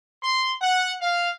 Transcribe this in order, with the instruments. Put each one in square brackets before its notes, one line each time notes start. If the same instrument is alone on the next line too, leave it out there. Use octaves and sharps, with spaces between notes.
[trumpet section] C6
F#5
F5